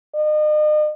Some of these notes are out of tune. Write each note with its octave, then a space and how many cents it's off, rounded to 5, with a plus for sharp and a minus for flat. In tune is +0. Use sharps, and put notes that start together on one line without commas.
D#5 -40